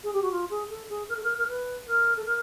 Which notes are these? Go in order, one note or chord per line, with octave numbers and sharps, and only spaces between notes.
G#4
G4
F#4
F4
G#4
A4
G#4
A#4
A4
A#4
A#4
B4
A#4
A4
A#4